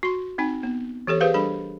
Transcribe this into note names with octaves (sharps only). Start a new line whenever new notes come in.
F#4 C6
C4 D#4 G#5
B3
E3 G4 A4 C#5
G4 G#4 B4 C5 F5
G3 D4 A4 B5